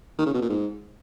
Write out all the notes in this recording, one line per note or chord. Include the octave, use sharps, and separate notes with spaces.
D#3
C#3
B2
A#2
G#2